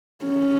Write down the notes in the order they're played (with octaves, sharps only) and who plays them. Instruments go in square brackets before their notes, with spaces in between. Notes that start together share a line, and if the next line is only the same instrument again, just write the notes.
[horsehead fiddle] C#4